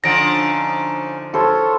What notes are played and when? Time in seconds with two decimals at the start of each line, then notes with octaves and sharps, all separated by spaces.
0.04 D3 F3 C#4 D#4 A#6 D7
1.34 E4 F4 A4 C5 C#5